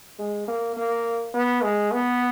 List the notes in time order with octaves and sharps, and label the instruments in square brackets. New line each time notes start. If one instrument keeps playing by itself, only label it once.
[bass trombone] G#3
A#3
A#3
B3
G#3
B3